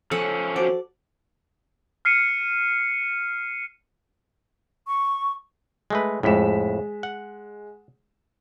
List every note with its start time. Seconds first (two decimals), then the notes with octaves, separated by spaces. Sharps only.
0.11 F3 C#4 A4 F#5
0.56 F#4 C5 D5 F#5
2.05 F6 C7 C#7 D#7
4.87 C#6
5.90 G#3 A3 B4
6.23 F2 A2 G#3 B6 E7
7.03 F#5